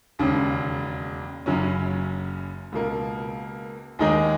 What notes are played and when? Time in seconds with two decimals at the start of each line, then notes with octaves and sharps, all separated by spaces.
0.19 E1 D#2 C#3
1.46 F#1 F#2 C#3 F#3 C#4
2.72 C#2 B2 A#3
3.99 D#2 D#3 G#3 D#4 G#4